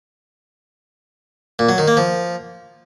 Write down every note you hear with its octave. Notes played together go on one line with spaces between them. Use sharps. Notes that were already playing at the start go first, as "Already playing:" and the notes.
A#2
F#3
D#3
A#3
F3